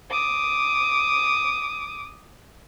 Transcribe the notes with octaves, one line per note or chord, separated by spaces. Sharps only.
D6 D#6